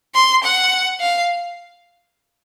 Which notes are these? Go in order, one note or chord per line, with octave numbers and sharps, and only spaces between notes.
C6
F#5
F5